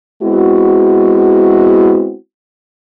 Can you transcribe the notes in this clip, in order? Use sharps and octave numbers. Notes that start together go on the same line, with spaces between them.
G#3 B3 C4 E4 F#4